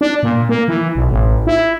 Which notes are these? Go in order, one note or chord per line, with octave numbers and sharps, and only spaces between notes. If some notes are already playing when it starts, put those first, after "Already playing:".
D4
A#2
A#3
E3
B1
A1
E4